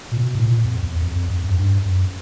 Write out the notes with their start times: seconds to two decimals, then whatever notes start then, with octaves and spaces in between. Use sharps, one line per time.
0.11 A#2
0.17 B2
0.35 A2
0.45 A#2
0.64 F2
0.82 E2
1.01 F2
1.16 F2
1.30 F2
1.43 F#2
1.58 G2
1.85 F#2